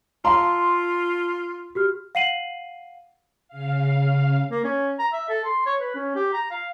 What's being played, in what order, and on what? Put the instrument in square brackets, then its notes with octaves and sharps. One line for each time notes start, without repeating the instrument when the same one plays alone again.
[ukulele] E4 F5 A#5 [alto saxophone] F4 [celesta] A5 [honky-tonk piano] C6
[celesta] F#4 G4 F6
F5 F#5 C7 D#7 F#7
[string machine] C#3 F5
[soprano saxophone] A#3
C#4
A#5
E5
A4
C6
C#5
B4
C#4
G4
A#5
F5